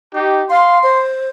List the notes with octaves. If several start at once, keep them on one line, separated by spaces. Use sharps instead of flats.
D#4 G4
F5 C6
C5